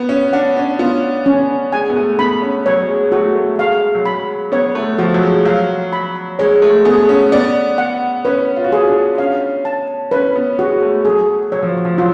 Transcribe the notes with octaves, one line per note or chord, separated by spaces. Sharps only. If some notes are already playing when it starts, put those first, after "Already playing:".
Already playing: B3 B4
C#4
D4 F#5
C#4
B3 F4
C#4
G#3 G#5
B3
A3
B3 B5
C#4
F#3 C#5
G#3
A3 F#4
A3
G#3 F5
F#3
G#3 B5
B3 C#5
A3
F3 F#4
F#3
G#3
F#3 F5
B5
G#3 C#5
A3
B3 G#4
C#4
B3 D5
F#5
C#4 B4
F4
F#4
F4 G#4
D4
C#4 F5
A5
C#4 B4
B3
G#3 F#4
A3
F#3 G#4
F#3 C#5
F3
F3
F#3 F4